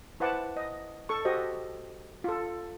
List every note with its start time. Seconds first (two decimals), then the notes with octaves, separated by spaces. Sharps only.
0.20 E4 B4 C5 F#5 A5 D6
0.57 D#5
1.09 A4 C#6
1.25 F#4 G4 C5 D#5
2.24 F4 A4